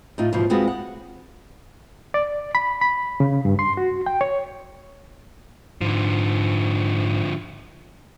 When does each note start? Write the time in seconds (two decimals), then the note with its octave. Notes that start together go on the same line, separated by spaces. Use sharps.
0.18 A2 D#4 F4
0.33 D#2 G#2 B2 E3 F3
0.50 G#3 B3 C4 F4 F#4
0.68 F#5
2.14 D5
2.55 B5
2.81 B5
3.20 C#3
3.45 G2
3.59 C6
3.77 F#4
4.06 G5
4.21 C#5
5.81 G#2 D3 F3